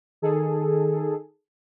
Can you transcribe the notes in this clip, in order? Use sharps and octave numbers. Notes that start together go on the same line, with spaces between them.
D#3 G#4 A4